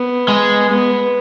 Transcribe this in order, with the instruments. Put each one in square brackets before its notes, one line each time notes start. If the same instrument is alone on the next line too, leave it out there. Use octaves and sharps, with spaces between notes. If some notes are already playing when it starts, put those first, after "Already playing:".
Already playing: [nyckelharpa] B3
[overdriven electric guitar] G#3
[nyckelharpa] B3